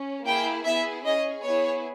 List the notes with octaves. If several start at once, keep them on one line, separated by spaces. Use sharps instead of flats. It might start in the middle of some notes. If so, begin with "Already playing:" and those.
Already playing: C#4
A#3 E4 G#4 G5
B3 E4 G#4 E5
C#4 G#4 D#5
B3 E4 G#4 C#5